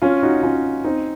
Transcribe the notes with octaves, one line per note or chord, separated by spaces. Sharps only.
C#4 F4
D#4 F#4
C#4 F4
C4 D#4